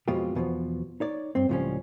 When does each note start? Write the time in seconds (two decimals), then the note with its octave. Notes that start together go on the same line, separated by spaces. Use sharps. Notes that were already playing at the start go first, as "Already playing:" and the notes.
0.08 F2 B2 G#3 F4 G4
0.35 E2 B2 D3 F3
1.00 D#4 C#5 D5
1.35 G2 C4
1.49 C#2 A2 F3 G3 C#4